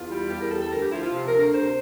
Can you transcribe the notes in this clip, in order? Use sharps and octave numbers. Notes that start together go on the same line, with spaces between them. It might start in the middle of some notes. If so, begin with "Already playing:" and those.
Already playing: E2 F4
G3
E2 G4
A#4
G3 A4
A4
D2 A#4
G4
F3 E4
F4
C3
A#4
D2
A#4
C3 C5